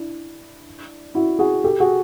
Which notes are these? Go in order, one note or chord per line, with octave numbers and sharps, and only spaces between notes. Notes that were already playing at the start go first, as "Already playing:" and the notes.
Already playing: D4 E4
E4 F#4
F#4 G#4
G4 A4
F#4 G#4